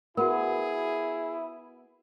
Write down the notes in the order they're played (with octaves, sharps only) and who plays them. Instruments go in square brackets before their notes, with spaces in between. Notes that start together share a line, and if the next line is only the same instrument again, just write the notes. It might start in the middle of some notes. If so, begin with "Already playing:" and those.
[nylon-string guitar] B3 [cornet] E4 [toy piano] F#4 A#4 [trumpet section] G#4